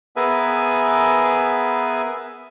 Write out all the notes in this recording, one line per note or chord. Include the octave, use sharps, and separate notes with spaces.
B3 G#4 A#4 B4 E5 G#5